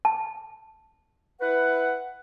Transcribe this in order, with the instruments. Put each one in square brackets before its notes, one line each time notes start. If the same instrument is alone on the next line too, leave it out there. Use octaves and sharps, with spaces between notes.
[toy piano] A5
[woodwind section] E4 B4 F#5